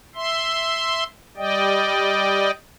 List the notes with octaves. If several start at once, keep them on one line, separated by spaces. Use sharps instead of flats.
E5 C6
G3 D5 D#5 G5